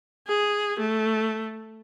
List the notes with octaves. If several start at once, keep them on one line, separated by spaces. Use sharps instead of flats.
G#4
A3